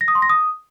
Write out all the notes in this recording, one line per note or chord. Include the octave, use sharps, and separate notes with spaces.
A#6
D#6
C6
A#6
D#6